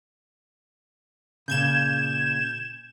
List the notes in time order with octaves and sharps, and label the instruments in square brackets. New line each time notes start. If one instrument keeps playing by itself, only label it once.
[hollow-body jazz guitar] A#2 C#3 [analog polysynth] G6 G#6 E7